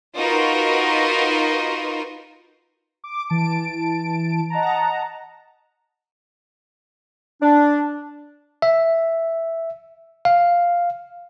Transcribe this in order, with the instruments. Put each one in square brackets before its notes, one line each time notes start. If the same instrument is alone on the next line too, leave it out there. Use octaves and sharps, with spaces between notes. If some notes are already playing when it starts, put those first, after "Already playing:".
[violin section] D#4 F4 F#4 A#4 B4
[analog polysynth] D6
E3 A5 D7
D#5 F#5 A5 A#5
[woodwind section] D4
[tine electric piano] E5
F5